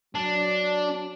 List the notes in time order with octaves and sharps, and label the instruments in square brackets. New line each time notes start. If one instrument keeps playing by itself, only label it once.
[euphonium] F#3 [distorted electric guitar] D4